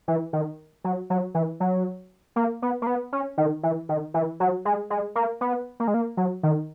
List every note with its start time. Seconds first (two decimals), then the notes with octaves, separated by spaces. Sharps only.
0.08 E3
0.33 D#3
0.84 F#3
1.10 F#3
1.35 E3
1.60 F#3
2.36 A#3
2.62 B3
2.82 A#3
2.87 B3
3.13 C#4
3.38 D#3
3.63 E3
3.89 D#3
4.14 E3
4.40 F#3
4.65 G#3
4.90 G#3
5.15 A#3
5.41 B3
5.80 A#3
5.88 G#3
5.94 A#3
6.17 F#3
6.43 D#3